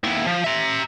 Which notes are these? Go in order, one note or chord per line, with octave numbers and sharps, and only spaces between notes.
D#2 E4
F3
E5 A#5